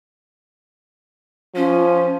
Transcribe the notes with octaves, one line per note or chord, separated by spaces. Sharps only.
F3 C#4